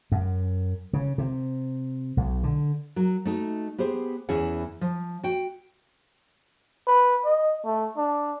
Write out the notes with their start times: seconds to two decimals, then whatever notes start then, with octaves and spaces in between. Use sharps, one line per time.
0.12 F#2
0.93 C#3
1.18 C3
2.17 B1
2.44 D3
2.96 F#3 A#4
3.25 A3 D#4 F#4
3.78 B3 G4 G#4 C5
4.29 E2 E3 C#4 E4 G#4 F#5
4.81 F3
5.23 F#4 G5
6.87 B4
7.25 D#5
7.65 A3
7.97 D4